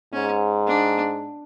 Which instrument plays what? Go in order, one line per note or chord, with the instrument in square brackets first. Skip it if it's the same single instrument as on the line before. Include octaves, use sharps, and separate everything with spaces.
[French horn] G#2 [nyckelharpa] C#4
[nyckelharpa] D4